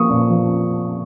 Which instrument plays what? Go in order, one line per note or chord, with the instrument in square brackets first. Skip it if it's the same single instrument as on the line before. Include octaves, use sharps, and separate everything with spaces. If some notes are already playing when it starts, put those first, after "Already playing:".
Already playing: [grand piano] F3 A#3 C#6 D#6
A#2
F3